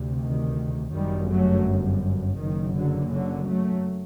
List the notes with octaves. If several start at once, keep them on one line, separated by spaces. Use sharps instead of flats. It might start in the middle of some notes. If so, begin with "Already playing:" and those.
Already playing: D2 C3
D#3
G1 F#2 D#3 G3
F#3 A3
F#1 F#2 D#3
D3 F#3
D3 F#3
F#3 A3